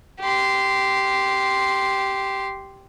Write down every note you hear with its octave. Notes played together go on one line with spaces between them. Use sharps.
G4 C6